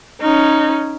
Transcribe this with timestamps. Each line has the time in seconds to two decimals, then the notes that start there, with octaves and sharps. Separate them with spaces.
0.21 C#4 D#4